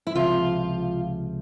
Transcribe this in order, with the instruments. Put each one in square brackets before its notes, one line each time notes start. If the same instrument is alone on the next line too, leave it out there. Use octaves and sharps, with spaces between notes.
[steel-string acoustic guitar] E4
[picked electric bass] C#2 C3 F3 [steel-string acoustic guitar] F4